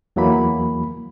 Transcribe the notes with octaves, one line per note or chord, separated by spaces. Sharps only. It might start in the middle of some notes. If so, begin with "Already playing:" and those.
E2 E3 F#3 A#3 B5